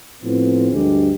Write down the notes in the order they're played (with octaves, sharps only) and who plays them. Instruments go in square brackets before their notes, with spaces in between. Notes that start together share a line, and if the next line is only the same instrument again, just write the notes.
[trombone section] A2 F3 B3 C4
D2 G2 G#3 G4 G#4